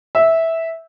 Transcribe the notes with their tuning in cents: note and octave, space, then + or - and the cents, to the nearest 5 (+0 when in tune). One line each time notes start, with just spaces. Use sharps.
E5 -10